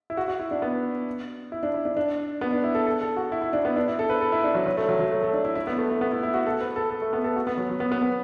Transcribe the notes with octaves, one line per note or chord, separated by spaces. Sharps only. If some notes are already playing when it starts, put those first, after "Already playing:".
E4
F#4
F#4
E4
D4
B3
E4
D4
E4
D4
D4
B3
D4
E4
A4
A4
A4
F#4
E4
E4
D4
B3
D4
E4
A4
B4
A4
E4
D4
F#3
F#3
A3
F#3
F#3
A3
A3
D4
E4
E4
B3
A3
A3
B3
E4
E4
F#4
A4
B4
A4
A4
A3
B3
A4
F#4
B3
F#3
F#3
B3
B3
B3